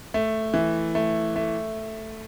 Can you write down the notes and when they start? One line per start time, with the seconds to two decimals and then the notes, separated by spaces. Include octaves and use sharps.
0.14 A3
0.54 E3
0.95 A3
1.36 A3